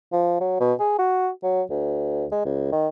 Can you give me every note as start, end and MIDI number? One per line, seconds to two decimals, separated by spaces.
0.12 0.38 53
0.40 0.59 54
0.60 0.73 47
0.80 0.94 68
0.99 1.29 66
1.43 1.63 54
1.70 2.26 38
2.32 2.43 56
2.45 2.71 37
2.72 2.88 51